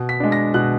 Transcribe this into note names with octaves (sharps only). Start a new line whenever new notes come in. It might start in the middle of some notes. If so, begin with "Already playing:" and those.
Already playing: B2
B6
G#3 D4
A#6
B2 F#6